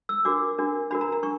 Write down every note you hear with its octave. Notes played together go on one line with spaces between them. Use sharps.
E6
D4 F#4 A#4 D6
D4 F#4 A#4
D4 F#4 A#4 B5
A#5
A#5
D4 C#6